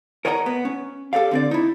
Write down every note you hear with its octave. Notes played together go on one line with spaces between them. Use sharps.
A#4 C#5 D#5 F#5 A5 A#5
B3
C#4
G4 A4 C5 D5 F5
D3 C4 D5
D#4 E4